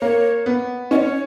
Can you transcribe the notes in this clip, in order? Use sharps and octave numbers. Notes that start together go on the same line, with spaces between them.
A#3 C#5
B3
C#4 C#5 D#5